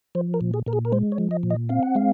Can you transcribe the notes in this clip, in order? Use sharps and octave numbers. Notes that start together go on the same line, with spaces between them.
F3 C5
A#4
A#2
G#4
A#2 A#4
G#4
A#4
G#3 C5
C#5
F3
D#5
A#2
D#5
C4 F5
F#5
G#3 F5